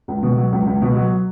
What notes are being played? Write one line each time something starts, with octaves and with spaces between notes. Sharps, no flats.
C#2
B2
F#3
C#2
C#2
B2
F#3